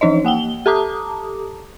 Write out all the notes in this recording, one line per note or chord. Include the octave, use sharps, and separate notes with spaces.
E3 F3 D#4 C#5 D#5
A#3 F#5 G5 G7
G4 A4 A5 A#5 D6 D#6